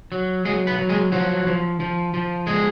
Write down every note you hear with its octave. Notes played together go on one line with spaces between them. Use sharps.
F#3
F#3 G#3 G#4
B3 B4
F#3
G#3 G#4
F3 F#3 F#4
F3
F3
F3
G#3 G#4